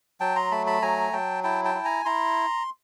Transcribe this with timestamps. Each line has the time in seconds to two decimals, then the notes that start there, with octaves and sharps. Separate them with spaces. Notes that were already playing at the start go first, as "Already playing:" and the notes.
0.20 F#3 G5 A5
0.36 A#5 C6
0.51 A3 A5 B5
0.66 A5 B5
0.82 F#3 G#5 A#5
1.13 F#3 G5 A5
1.44 E4 G5 A5
1.65 G5 A5
1.75 E4
1.85 G#5 A#5
2.05 E4 A#5 C6